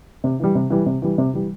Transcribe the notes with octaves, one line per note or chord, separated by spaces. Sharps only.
C3
E3 G3
C3
E3 G3
C3
E3 G3
C3
E3 G3